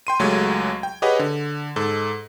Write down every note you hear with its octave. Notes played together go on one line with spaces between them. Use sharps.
G5 C6 D#7
C#2 F#3 G#3 A3 G4 G#6
G5
G4 G#4 B4 C#5 D#5 F#5
D3
G#2 A4